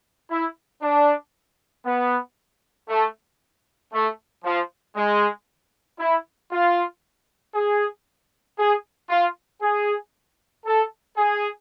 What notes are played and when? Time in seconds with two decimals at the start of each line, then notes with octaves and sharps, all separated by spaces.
0.30 E4
0.82 D4
1.86 B3
2.89 A3
3.93 A3
4.44 F3
4.96 G#3
5.99 E4
6.51 F4
7.55 G#4
8.58 G#4
9.10 F4
9.62 G#4
10.66 A4
11.17 G#4